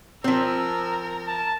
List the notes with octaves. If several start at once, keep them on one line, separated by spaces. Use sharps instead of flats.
F3 C4 A#4 E6
A5